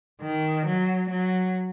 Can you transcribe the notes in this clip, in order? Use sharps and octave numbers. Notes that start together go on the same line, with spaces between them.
D#3
F#3
F#3